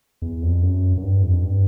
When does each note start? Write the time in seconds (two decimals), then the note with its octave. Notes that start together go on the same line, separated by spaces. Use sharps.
0.22 E2
0.42 F2
0.63 F#2
0.97 F#2
1.02 G2
1.23 F2
1.42 G2